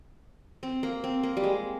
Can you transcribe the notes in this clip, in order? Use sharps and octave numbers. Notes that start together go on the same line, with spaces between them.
C4
A#3
C4
A#3
G3
G#3